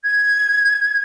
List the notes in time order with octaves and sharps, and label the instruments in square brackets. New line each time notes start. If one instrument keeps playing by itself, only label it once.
[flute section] G#6